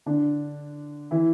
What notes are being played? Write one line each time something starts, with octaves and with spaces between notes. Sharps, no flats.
D3 D4
E3 E4